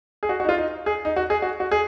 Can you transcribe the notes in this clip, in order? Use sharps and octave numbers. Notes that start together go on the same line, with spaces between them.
G#4
F#4
F#4
D#4
F4
D#4
G#4
D#4
F#4
G#4
F#4
F#4
G#4